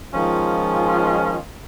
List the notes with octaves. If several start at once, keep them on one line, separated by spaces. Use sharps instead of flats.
D#3 F3 G#3 C#4 F4